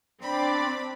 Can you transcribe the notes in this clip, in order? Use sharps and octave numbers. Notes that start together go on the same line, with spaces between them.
C4 D4 D5 B5